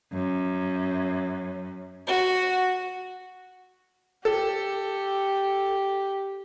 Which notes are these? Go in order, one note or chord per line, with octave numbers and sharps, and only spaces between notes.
F#2
F#4
G4 A4